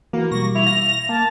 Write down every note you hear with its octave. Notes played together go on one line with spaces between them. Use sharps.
E3 A#3 F#4
B2 G3 C#6 A#6
E4 F7
F5 A#6
A#3 A5